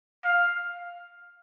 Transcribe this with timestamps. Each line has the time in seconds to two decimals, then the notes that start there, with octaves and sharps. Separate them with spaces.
0.25 F5